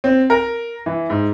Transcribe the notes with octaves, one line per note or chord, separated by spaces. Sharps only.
C4
A#4
E3
G#2